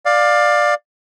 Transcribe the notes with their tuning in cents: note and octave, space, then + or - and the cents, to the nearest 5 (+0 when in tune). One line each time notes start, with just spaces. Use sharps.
D5 +15 F5 +15